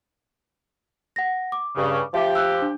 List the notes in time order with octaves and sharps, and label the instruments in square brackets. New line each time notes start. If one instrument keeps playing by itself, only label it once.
[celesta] F#5 A#6
D6
[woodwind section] G2 C#3
[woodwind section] F3 G4 [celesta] E5
[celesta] E6 F#6
D4